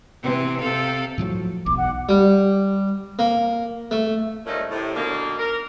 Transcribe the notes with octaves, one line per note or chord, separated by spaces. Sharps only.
C3 E3 C4
C3 A4 F5
A2 F3 F#3
E1 B1 D6
F#5
G3
A#3
A3
G2 A#2 F3 A3 C#4 D#4
A2 C3
B2 D3 D#3 A#3
A#4